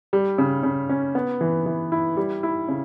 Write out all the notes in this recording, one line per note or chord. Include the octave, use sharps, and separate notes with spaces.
G3
C#3
C#3
C#4
B3
E3
E3
E4
G3
E4
C#3